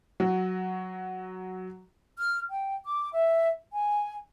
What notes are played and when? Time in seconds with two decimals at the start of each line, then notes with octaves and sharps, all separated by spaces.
0.20 F#3 F#4
2.18 F6
2.50 G5
2.85 D6
3.13 E5
3.72 G#5